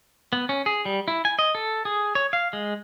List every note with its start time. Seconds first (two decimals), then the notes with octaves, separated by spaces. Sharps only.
0.33 B3
0.49 C#4
0.66 G#4
0.85 G3
1.08 E4
1.25 G#5
1.39 D#5
1.55 A4
1.85 G#4
2.15 C#5
2.33 F5
2.53 G#3